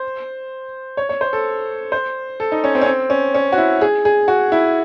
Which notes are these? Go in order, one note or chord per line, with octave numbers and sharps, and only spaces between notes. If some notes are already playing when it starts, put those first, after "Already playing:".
Already playing: C5
C#5
C#5
C5
A4
C5
A4
D#4
C#4
C4
C#4
C4
C#4
C#4
F#4
E4
G#4
G#4
F#4
E4